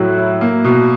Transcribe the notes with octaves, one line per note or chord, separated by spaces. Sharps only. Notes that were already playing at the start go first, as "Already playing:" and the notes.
Already playing: A2 F#3 E4 F#6
E4
A#3
B2